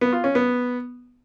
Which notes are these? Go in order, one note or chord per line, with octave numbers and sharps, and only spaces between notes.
B3
F4
C#4
B3